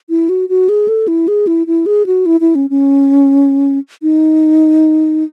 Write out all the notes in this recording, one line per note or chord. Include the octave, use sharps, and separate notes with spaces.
E4
F#4
F#4
G#4
A4
E4
G#4
E4
E4
G#4
F#4
E4
E4
C#4
C#4
D#4